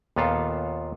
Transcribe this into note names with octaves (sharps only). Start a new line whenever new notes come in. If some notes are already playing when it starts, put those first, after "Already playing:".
D#2 A#2 B3 F4 A4 F5